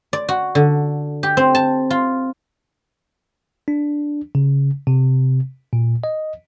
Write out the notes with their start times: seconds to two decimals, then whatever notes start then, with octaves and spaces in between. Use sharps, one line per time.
0.13 D5
0.29 F#4
0.55 D3
1.23 G4
1.37 C4
1.55 A5
1.90 F4
3.68 D4
4.35 C#3
4.87 C3
5.73 A#2
6.04 D#5